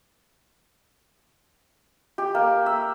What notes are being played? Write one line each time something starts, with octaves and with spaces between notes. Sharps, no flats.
G4
A#3
E5